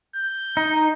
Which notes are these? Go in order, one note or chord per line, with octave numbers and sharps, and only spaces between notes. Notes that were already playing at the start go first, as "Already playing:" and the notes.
G6
D#4